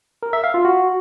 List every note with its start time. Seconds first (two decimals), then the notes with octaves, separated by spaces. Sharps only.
0.23 A#4
0.33 E5
0.44 F5
0.54 F4
0.65 F#4